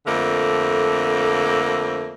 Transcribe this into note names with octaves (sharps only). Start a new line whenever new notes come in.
F2 D3 A3 A#3